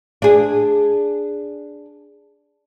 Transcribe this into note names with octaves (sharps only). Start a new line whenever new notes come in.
D4 G#4